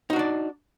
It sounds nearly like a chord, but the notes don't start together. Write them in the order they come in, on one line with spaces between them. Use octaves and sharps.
D#4 F#4 D4 D5